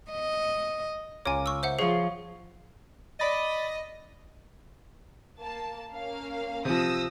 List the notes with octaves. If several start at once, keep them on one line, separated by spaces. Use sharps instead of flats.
D#5
C#2 F4 A#4 C#5 G#5 D6
C#6 E6
C5 E5 F#5
F3 G#4 C#5 C6
D5 D#5 B5 A6
A#3 A5
A#3 C#4 F5
C3 F3 D#6 E6 A#6